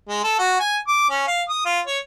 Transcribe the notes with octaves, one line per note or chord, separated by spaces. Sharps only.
G#3
A4
F#4
G#5
D6
C#4
F5
D#6
F4
C#5